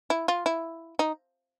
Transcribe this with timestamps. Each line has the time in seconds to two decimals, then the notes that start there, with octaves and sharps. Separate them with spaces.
0.10 E4
0.28 F4
0.46 E4
0.99 D#4